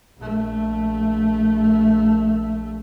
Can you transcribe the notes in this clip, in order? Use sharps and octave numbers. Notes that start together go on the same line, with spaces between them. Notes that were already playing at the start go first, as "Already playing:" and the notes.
A#1 A3